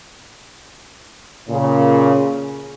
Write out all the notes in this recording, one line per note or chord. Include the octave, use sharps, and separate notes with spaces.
A#2 C#3